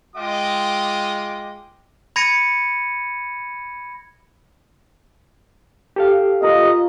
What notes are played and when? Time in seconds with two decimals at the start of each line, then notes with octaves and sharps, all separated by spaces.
0.16 G#3 F4 D#5 G5 D6
2.16 B5 G#6 A#6 C#7 D#7
5.96 G4 A4 F5
6.42 F4 A#4 D#5 C#6